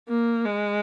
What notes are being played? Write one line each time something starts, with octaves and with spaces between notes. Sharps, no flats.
A#3
G#3